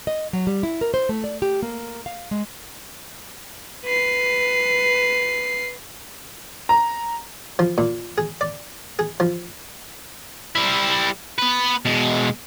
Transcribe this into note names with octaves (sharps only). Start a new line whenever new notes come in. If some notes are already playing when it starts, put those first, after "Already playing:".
D#5
F#3
G3
E4
A#4
C5
A3
D5
G4
A#3
F5
G#3
B4 C7
A#5
F3
A#2
G#4
D5
G#4
F3
G3 E4
B3 B4
B2 G#3